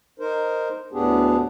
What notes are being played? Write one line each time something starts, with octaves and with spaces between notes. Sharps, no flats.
D#4 A#4 C5
D2 A2 B3 D4 G4 G#4